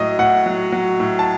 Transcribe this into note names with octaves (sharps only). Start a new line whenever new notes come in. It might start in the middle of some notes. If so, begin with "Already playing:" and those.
Already playing: A2 F#3 D#5
A2 F#5
F#3
F#3
A2
A5